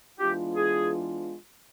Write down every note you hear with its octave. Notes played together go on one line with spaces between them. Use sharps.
E3 G#3 B3 D4 F4 G4
G#4